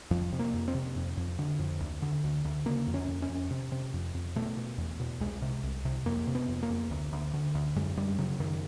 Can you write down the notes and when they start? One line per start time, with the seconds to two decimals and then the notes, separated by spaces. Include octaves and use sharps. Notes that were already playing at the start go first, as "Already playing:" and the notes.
0.11 F2 F3
0.32 C3
0.39 A#3
0.54 F2
0.68 C4
0.75 C3
0.96 F2
1.17 F2
1.39 D3
1.59 F2
1.81 D2
2.02 D3
2.24 D2
2.45 D2
2.66 C#3 A#3
2.87 F2
2.94 C#4
3.08 F2
3.22 C#4
3.30 F2
3.51 C3
3.72 C3
3.94 F2
4.15 F2
4.36 B2 A3
4.57 B2
4.78 E2
5.00 B2
5.21 C2 G#3
5.42 C3
5.64 C2
5.85 C3
6.06 F2 A#3
6.27 C3
6.35 B3
6.48 F2
6.63 A#3
6.70 F2
6.91 D2
7.13 D2
7.34 D3
7.55 D2
7.76 F#2 G#3
7.97 F#2 G3
8.18 C#3 F#3
8.40 F#2 D#3